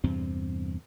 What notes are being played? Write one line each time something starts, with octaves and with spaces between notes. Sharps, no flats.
E2 G2 C3 C4